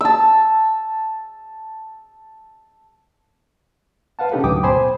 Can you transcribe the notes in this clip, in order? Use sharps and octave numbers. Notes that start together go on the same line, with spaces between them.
A5 E6
B4 F5 F#5 A5
C3 C#4 D#4 G4 A4 B4
D2 G#2 F#3 G5 D6 D#6
B2 C5 G#5 B5